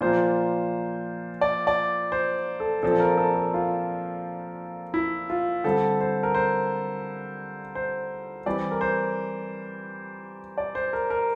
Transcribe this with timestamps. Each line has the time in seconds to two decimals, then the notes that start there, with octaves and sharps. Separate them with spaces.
0.01 A#2 F3 A#3 C5
1.41 D5
1.67 D5
2.12 C5
2.60 A4
2.83 A#2 F3 C4 A4
3.00 A#4
3.18 A4
3.35 A4
3.54 F4
4.94 E4
5.30 F4
5.64 D3 G3 C4 A4
6.00 C5
6.23 A#4
6.35 C5
7.75 C5
8.46 E3 G3 C4 D5
8.71 A#4
8.81 C5
10.58 D5
10.75 C5
10.93 A#4
11.10 A#4